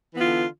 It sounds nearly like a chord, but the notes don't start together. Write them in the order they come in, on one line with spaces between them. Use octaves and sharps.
E3 B3 F4 D3